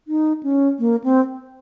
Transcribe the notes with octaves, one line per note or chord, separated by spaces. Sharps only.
D#4
C#4
A#3
C4